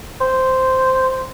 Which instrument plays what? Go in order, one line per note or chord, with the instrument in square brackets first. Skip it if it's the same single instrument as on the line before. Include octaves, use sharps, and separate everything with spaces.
[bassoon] C5